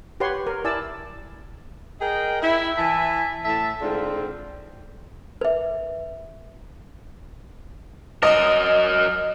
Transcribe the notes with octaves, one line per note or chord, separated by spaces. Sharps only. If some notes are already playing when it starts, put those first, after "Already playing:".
G4 B4 C#5 F#5 C6 C#6
A#4
E4 D5 G#5 A5 E6
G#4 A#4 D#5 G5
E4
E3 E5 G#5 A5
A2 E5 A5
G#2 D3 C4 F4
B4 E5
F#3 A#4 D#5